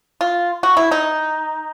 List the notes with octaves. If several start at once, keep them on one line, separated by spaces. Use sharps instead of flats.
F4
F#4
E4
D#4